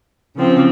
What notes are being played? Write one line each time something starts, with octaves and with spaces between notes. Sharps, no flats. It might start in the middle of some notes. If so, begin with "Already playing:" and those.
C#3 F3 C4